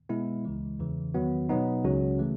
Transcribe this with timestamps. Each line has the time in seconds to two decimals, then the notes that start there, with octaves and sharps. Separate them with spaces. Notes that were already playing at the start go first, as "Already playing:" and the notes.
0.09 B2 G#3 B3 E4
0.44 C#2 C#3 E3 G#3
0.79 E2 C#3 E3
1.14 E2 D#3 F#3 B3 F#4
1.49 B2 F#3 B3 D#4
1.84 C#2 C#3 F#3 C#4 F#4
2.19 C#3 E3 A3